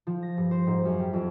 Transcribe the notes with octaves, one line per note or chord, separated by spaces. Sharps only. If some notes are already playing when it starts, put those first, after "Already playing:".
F3
A#6
G2
C5
G#2
F#2
G3
F2